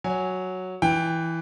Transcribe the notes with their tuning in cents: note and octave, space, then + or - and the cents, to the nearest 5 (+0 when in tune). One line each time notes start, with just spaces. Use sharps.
F#3 +0 G#5 +0
E3 +0 G5 +10